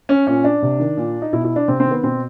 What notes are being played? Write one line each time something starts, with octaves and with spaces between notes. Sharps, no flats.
C#4
A#2 C#4
D4
C3
D#3
A#2
D#4
B2 E4
E4
D4
C3 C4
C4
D#3
B3
B2 C4